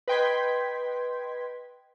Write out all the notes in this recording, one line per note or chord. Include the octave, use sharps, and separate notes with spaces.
B4 D#5 G5 C6 G#6 B6